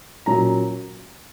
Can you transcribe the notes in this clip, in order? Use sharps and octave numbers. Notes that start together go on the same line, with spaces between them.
A#2 F#3 C#4 A#5